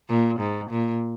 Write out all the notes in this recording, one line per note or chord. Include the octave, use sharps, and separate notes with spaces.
A#2
G#2
A#2